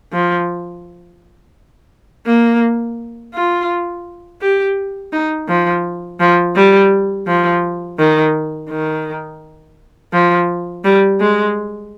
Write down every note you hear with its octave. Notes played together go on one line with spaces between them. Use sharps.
F3
A#3
F4
G4
D#4
F3
F3
G3
F3
D#3
D#3
F3
G3
G#3